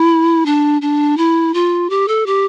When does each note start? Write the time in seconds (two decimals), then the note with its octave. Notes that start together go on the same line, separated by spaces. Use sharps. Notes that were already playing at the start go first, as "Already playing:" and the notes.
Already playing: E4
0.46 D4
0.82 D4
1.17 E4
1.54 F4
1.90 G4
2.08 A4
2.26 G4